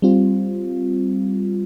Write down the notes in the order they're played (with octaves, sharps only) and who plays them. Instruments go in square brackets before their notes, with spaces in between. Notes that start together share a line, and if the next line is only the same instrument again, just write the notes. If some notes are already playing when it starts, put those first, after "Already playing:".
[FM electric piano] G3 C4 F4